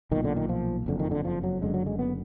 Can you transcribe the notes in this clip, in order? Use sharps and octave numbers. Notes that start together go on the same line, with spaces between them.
B1 A#2 D#3
D3
D#3
F3
F#1 F2 D3
D#3
D3
F3
F#3
F#1 F#2 D3 G#3
F#3
G#3
B3